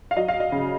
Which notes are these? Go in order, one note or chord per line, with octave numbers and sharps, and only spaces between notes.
F5
F#3 D#5
F5
D#5
C#3